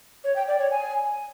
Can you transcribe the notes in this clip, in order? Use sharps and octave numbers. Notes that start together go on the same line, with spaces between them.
C#5
G5
D5
C#5
G#5